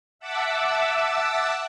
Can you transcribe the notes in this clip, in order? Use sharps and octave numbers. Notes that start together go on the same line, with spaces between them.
E5 F#5 A5 D6 E6